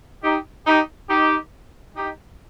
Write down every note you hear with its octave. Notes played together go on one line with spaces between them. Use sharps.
D#4 G4
D#4 G4
D#4 G4
D#4 G4